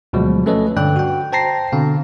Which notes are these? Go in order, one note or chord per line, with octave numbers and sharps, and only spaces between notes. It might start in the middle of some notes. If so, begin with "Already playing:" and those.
D2 B2 F3 F#3 G#3
A3 C#4 A4 B4 C#5 D#5
G2 D3 D5 G5 F#6
F#4 G5
C5 G5 A5 A#5 A#6 C7
B2 D3 C4 F5